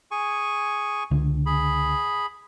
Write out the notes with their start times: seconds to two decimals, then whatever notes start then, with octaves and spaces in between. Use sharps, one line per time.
0.11 G#4 G#5 C#6
1.11 C#2 D3
1.46 G#4 B5